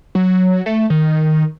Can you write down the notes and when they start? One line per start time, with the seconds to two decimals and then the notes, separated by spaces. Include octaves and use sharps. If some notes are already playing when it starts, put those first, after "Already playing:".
0.15 F#3
0.66 A3
0.90 D#3